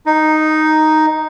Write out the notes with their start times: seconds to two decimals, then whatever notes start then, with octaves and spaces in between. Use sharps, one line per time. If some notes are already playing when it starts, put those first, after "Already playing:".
0.06 D#4